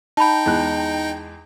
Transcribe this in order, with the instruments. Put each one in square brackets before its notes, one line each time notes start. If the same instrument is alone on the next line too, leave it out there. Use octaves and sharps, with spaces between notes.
[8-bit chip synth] D#4 G5 [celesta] A5 B5
[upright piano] E2 G#3 F#6